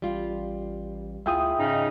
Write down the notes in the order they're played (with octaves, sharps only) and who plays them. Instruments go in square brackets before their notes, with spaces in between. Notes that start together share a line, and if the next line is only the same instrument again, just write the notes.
[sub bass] A1 [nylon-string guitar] G3 F4
[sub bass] D2 [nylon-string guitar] E4 F4 G#4 [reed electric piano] E5 G5 D#6
[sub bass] G#2 [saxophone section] C#3 D#4